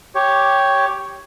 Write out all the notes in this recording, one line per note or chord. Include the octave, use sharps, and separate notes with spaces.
G4 C#5